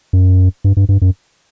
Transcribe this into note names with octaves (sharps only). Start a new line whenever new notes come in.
F#2
G2
G2
G2
F#2